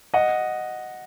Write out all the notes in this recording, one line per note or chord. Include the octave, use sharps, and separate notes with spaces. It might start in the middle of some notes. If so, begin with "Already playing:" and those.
D#5 F#5